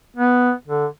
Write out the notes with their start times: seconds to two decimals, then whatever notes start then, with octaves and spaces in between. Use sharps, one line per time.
0.17 B3
0.68 D3